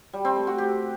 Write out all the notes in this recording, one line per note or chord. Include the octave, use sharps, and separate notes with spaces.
G3
C4
A3
F#4
G4